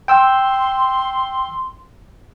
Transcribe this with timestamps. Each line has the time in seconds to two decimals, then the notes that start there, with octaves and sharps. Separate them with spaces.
0.08 G5 C6 E6